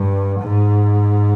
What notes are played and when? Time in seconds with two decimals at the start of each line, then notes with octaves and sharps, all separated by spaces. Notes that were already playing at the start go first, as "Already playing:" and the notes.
Already playing: G2
0.40 G#2